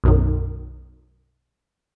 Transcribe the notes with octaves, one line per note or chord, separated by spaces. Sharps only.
B1 F#2 D#3